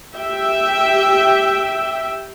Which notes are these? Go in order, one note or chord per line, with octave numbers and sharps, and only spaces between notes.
G4 E5 G5